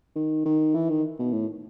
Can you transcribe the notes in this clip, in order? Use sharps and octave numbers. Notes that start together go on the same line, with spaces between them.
D#3
D#3
E3
D#3
B2
A2